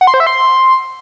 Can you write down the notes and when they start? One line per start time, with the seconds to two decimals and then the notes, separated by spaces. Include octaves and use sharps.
0.01 F#5
0.07 C6
0.14 C5
0.20 E5
0.27 C6